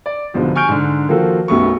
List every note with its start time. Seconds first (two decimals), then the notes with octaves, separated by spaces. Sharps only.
0.06 D5
0.34 C2 G#2 B2 D3 F3 B3
0.55 G#5 C#6 F6 G6 D7
0.68 G#2 D3
1.08 D#3 F3 A#3 F4 F#4 A4
1.48 B1 F#2 G3 A3 B3 C#6